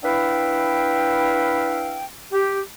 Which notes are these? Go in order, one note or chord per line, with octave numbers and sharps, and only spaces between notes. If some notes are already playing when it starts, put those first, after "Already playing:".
D4 E4 B4 E5 F5 G5
G4